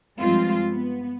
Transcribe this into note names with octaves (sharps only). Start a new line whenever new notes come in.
G2 F3 G#3 C4 F4
B3